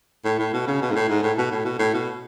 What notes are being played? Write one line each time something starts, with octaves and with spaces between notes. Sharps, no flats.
A2
A2
B2
C#3
B2
G#2
A2
G#2
A2
B2
A2
B2
A2
B2